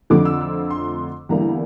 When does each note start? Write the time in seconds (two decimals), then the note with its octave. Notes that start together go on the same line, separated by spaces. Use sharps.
0.10 F2 D3 F3 A3 C4 D6
0.25 E6
0.41 E6
0.70 C6
1.29 E2 D3 G3 A#3 E4 A#5